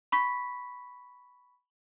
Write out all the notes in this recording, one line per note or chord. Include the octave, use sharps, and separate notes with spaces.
B5 C#6 B6